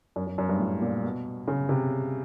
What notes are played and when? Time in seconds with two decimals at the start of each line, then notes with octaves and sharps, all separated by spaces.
0.16 F#2
0.27 F#2
0.38 F#2
0.49 G2
0.59 A2
0.81 A#2
1.04 B2
1.48 C#3
1.69 C3